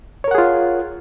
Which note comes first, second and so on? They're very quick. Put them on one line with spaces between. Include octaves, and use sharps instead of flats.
C#5 A#4 F#5 G#4 F4